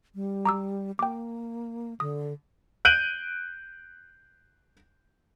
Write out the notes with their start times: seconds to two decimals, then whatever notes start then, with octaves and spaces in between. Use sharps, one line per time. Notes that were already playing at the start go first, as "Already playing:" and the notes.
0.15 G3
0.45 A#5 D6 E6
0.99 A#3 G5 D6
2.00 D3 D#6
2.85 F#6 G6 D7 D#7 F#7